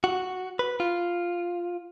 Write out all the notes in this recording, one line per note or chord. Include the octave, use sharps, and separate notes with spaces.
F#4
B4
F4